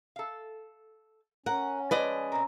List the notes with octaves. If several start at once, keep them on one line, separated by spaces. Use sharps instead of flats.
A4 F5
C#4 A#4 F#5
F3 G#3 B4 D5 D#5
A#2 C4 A#4